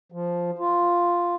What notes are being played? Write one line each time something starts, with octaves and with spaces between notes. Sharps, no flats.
F3
F4